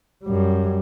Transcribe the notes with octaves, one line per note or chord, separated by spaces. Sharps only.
F#2 G3